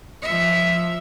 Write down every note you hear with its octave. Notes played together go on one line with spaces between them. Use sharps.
F3 E5